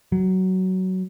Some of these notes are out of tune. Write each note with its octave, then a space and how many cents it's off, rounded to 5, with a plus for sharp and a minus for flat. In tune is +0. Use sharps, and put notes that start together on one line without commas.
F#3 +15